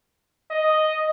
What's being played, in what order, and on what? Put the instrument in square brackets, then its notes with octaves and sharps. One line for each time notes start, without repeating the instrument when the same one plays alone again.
[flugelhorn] D#5